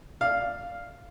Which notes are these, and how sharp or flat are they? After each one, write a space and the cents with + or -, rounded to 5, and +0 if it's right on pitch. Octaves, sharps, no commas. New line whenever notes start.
D5 +0 F5 +0